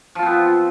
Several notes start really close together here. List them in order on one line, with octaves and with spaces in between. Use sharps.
F3 F4 C4 B3